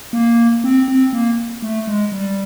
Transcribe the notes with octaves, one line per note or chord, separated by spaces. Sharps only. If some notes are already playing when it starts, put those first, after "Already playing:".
A#3
C4
C4
A#3
A3
G#3
G3